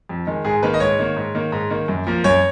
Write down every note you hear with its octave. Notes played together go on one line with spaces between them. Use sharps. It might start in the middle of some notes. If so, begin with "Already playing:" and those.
F2
D#3 G#3
G#2 G#4
D#3 A#3 B4
D#5
G#2 C#5
D#3 A#3
G#2
D#3 A#3
G#2
D#3 A#3
F#2
F3 A#3
F#2 C#5